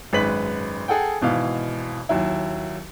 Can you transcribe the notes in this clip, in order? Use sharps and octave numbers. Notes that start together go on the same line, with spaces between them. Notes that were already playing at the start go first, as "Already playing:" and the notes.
G#1 F#2 G#3 B4 B6 F#7
G#4 A4 F#5 G5
G#1 B2 E3 F5
D#2 F#3 E4